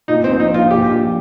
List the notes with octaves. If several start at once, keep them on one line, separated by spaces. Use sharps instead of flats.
A#2 D#4
C4
A#1
D#4
A#3 F4
A#2 G4
A#1